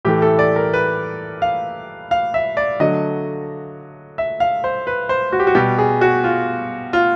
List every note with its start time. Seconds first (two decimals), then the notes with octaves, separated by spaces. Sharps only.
0.05 A2 E3 A3 G4
0.22 A4
0.39 D5
0.56 A#4
0.73 B4
1.42 F5
2.11 F5
2.34 E5
2.57 D5
2.80 D3 F#3 A3 D#5
4.18 E5
4.40 F5
4.64 C5
4.87 B4
5.09 C5
5.32 F#4
5.40 G4
5.47 F#4
5.55 B2 G3 G4
5.78 G#4
6.01 F#4
6.24 F4
6.93 F4